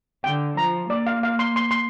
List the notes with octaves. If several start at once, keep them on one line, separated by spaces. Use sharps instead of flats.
D3 G5
F3 A#5
A#3 D5
F5
F5
C6
C6
C6